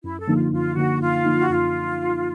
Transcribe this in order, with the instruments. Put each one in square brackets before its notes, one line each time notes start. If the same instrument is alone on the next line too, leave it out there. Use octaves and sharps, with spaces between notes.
[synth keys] F#2 [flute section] E4
[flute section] A4
[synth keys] D3 F3 A#3 D#4
[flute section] F4
[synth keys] F#2 [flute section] F4
[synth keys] D3 F3 A#3 D#4 [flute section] F#4
[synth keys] F#2 [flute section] F4
[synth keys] D3 F3 A#3 D#4
[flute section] F#4
[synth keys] F#2 [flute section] F4